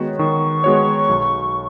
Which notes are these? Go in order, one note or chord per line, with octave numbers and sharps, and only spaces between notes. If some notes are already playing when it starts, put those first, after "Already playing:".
Already playing: D#3 G#3 B3 F#4 C#5
D#3 C#6
G#3 B3 F#4 C#5
B1